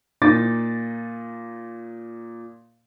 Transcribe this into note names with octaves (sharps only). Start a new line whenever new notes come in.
A#2 D#4 D6 A6